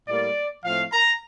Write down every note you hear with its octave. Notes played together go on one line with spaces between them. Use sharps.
A2 G3 A#3 D5
A2 F3 A3 C4 F5
A#5